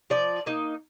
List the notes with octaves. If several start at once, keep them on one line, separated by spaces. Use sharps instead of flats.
F3 D5
A#3 D#4